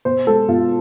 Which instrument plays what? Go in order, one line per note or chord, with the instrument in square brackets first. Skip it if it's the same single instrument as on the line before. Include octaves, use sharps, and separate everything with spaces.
[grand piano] B2 C5
G#3 A4
B2 F4